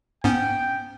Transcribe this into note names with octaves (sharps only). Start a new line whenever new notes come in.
G#2 B3 C#4 G5